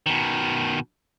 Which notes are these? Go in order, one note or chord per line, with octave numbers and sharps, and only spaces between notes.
B2 D#3